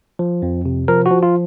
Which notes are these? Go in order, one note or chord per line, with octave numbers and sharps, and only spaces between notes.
F3
F2
C3
F3 A#4
F#4
F3
F4